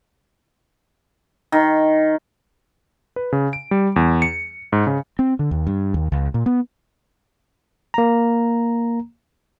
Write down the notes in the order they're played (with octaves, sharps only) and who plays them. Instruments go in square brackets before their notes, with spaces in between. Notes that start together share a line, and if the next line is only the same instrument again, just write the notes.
[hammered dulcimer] D#3
[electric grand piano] B4
C#3
D7
G3
E2
C#7
G#2
C#3
[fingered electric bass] C4
D3
D#2
G2
D#2
C#2
A#2
B3
[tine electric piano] A#3 A#5